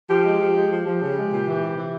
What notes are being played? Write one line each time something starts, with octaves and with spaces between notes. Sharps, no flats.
F3 G4
G#3
F3
G#3
F3
F3 G4
C#3
G#3
A#2
E3
C3
E3